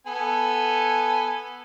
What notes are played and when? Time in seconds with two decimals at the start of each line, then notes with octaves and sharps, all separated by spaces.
0.07 B3 A4 G#5